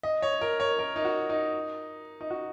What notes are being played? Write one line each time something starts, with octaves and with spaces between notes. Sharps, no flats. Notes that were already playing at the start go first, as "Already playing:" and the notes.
D#5
C#5
A#4
C#5
A#4
D#4
F#4
D#4
D#4
F#4